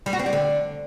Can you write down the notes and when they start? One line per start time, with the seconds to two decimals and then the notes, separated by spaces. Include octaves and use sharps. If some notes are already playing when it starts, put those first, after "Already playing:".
0.06 G3
0.13 F#4
0.19 C4
0.26 G3
0.33 D3